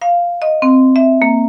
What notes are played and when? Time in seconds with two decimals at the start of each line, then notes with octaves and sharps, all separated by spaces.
0.02 F5
0.42 D#5
0.62 C4
0.96 E5
1.22 A#3